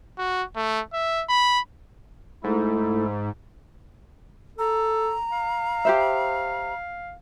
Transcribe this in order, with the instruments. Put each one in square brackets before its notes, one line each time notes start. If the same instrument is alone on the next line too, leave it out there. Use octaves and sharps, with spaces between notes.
[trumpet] F#4
A3
E5
B5
[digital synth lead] G#2 [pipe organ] A3 E4 A4
[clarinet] A4 [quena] A#5
[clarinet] F5
[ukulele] G4 C5 E5